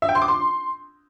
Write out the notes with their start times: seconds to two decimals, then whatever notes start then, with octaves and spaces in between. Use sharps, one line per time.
0.02 E5
0.09 G5
0.15 C6
0.22 D6
0.28 C6